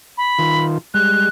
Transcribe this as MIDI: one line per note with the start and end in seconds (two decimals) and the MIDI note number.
0.18 0.65 83
0.39 0.78 51
0.39 0.78 65
0.94 1.29 55
0.94 1.29 56
0.94 1.29 90